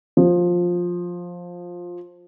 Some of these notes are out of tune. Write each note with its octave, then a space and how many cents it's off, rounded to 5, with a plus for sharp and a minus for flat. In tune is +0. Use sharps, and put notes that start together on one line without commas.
F3 +15